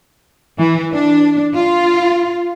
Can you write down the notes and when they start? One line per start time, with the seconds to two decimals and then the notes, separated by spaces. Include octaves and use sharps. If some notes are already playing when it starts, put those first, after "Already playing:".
0.57 E3
0.93 D4
1.55 F4